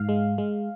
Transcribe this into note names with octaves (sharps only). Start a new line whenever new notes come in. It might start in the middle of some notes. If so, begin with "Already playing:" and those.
Already playing: G#2 F5
G#3
G#3